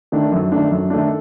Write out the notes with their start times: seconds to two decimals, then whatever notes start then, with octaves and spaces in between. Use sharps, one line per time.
0.12 D#3 A3 D4
0.32 F#2
0.52 D#3 A3 D4
0.71 F#2
0.90 D#3 A3 D4